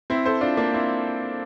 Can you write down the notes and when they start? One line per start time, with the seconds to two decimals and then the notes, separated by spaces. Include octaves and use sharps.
0.10 C4 E4
0.25 A4 C5
0.41 D4 F4
0.57 A#3 D4
0.74 C4 E4